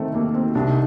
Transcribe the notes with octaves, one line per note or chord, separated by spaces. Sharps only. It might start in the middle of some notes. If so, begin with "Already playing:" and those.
Already playing: D#3 A3 C4
D#2 A#3
D#3 C4
C2 D4
D#4